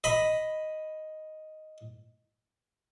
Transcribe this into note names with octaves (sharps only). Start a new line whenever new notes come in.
D#5 B5